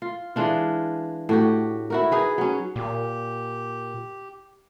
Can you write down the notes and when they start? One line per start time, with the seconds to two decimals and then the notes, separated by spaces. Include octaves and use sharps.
0.02 F4
0.36 E3 G#3 D4 F4
1.29 A2 F#4 G4
1.90 E4 F#4 A#4
2.11 D#4 G#4 B4
2.38 F#3 C#4
2.76 A#2 G4